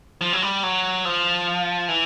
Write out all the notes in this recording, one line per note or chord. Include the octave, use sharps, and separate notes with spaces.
F3
F#3
G3
F#3
F3
E3